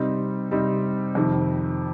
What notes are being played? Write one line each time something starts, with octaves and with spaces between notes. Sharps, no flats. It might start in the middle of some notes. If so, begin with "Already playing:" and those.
Already playing: C3 G3 C4 D#4
C3 G3 C4 D#4
F2 C3 D#3